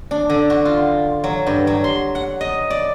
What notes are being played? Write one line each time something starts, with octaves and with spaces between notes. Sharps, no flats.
D4
D3
F#4
F4
F#3
G2
F#3
C6
F#5
D#5
D5